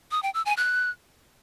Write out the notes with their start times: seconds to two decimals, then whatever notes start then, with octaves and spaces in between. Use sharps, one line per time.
0.11 D#6
0.23 G5
0.34 E6
0.46 G#5
0.57 F#6